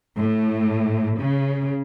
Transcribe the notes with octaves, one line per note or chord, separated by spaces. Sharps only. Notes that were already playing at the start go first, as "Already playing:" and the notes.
A2
C#3